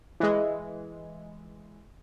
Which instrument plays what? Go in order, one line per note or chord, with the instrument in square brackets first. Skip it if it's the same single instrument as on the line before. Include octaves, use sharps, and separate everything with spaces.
[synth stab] E3 G#3